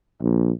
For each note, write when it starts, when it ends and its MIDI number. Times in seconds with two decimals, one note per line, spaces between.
0.22 0.51 34